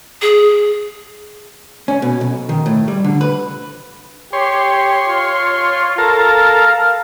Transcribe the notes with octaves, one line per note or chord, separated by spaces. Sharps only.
G#4
C#4
B2
B1
D#3
A2
G3
D3
B4
G4 C#5 C6
F4
A4 A#4 F5